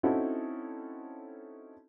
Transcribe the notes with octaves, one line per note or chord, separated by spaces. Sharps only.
C4 C#4 D#4 E4 F#4 A4